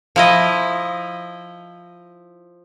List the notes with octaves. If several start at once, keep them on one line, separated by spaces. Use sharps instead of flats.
F3 E4 D#5